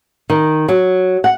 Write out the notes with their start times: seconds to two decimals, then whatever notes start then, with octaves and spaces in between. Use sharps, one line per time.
0.30 D#3
0.68 F#3
1.24 F#5